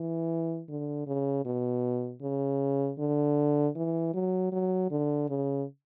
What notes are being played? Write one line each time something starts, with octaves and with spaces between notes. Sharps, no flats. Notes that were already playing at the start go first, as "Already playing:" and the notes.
Already playing: E3
D3
C#3
B2
C#3
D3
E3
F#3
F#3
D3
C#3